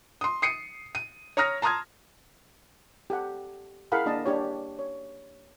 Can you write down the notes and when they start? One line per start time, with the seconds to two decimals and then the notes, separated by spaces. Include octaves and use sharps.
0.21 C6 D#6
0.42 D#6 C7 C#7 D#7
0.95 D#7
1.37 C#5 A#5 D#6 F6 A#6
1.62 A5 A#5 C6 D#6 F6 G#6
3.10 G4 A4 F#5
3.92 E4 G#4 A#4 F5 F#5 B5
4.06 A#3 D4 D#5 A5
4.26 D4 G4 C#5
4.79 C#5